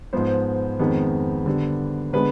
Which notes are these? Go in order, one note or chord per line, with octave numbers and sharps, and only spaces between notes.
G#2 F3 B3 C5
F2 D#3 G#3 B3
D3 G3 B3
D3 G#3 B3 B4